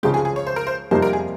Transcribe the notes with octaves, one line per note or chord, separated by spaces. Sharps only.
C#2 C#3 F3 G#3 G4
G#4
G#4
C#5
C5
A#4
C5
F2 C3 G3 A#3 D#4 C5
A#4
G#4